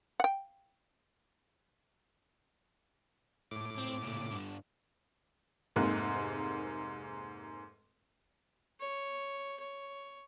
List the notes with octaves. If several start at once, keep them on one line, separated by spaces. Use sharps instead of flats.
F#5 G5
A2 D6
C4
A#2 C#3
G2 D3
F1 G#2 C3 A#3 F#6
C#5
C#5